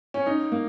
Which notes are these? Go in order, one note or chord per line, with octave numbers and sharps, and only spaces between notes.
C#4
D#4
A#3